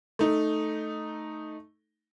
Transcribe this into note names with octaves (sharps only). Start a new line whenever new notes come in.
A3 D#4